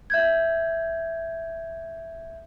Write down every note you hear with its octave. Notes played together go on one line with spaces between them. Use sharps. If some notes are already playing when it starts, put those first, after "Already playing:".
E5 G6 G#6